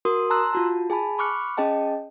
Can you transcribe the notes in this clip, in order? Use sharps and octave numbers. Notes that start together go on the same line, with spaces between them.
F#4 A#4 C6 D#6
A5 A#5 C6 E6 F#6
F4 F#4 A5
G#4 G#5 A5 B5
B5 C#6 D6 F6 F#6 C#7
C#4 G#4 D#5 G5 A5